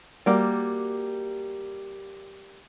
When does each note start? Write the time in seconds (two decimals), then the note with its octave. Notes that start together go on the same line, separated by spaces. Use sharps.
0.26 G3 A#3 F#4